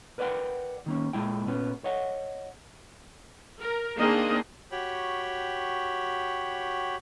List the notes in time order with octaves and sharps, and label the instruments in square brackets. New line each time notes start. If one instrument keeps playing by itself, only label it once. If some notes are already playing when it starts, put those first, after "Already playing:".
[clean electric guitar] A#4 B4 D5 E5 F#5 G5
D#3 A#3 C#4
A#2 G#3 E4 G5
A#2 B3 C#4
C#5 D#5 F#5
[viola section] A#4
D#3 A#3 C4 D4 G#4 D#5
[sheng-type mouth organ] F#4 G4 C#5 G5 B5